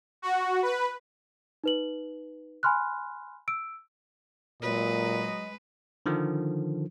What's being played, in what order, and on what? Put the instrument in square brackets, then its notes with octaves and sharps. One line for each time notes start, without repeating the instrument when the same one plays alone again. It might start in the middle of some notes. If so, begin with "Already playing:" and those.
[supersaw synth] F#4
B4
[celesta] D#4 B4 F#7
G#5 B5 C6 F6 F#6
E6 D7
[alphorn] A#2 [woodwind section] F#3 D#5 [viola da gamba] G#3 B4
[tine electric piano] D3 D#3 F3